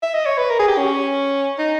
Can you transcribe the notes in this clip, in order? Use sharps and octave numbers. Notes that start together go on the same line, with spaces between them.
E5
D#5
C#5
B4
A#4
G#4
G4
C#4
D#4